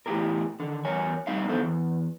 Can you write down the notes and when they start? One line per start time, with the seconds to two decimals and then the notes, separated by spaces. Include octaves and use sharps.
0.06 E2 A2 E4 G4 G#4 A#4
0.60 D3 D#3
0.85 E2 A#4 C#5 G#5
1.27 G3 C4 D#4 A#4 E5 F5
1.48 D3 F3 B3 A4 C5
1.63 E2